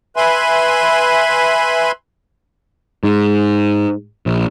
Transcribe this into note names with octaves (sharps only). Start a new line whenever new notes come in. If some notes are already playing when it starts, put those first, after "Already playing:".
B4 E5 G#5 B5 C6
G#2
A#1